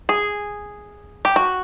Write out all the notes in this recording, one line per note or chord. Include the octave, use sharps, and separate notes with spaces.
G#4
G4
F#4